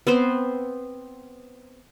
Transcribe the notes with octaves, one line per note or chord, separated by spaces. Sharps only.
B3 C4 C5